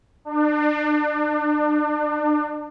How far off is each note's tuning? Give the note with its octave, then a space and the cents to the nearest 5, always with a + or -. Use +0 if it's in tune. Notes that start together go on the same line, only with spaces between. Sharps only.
D4 +35